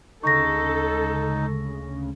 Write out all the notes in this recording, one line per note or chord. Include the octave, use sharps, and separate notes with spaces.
D2 C#3 G#3 D#4 A4 C#6 A#6